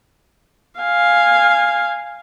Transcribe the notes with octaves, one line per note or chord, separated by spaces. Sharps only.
F5 G#5